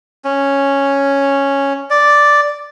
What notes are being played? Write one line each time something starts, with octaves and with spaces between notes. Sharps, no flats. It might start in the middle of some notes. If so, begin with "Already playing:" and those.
C#4
D5